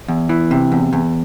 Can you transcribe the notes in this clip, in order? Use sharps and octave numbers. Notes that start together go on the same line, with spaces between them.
E2
E3
C3
E2
E2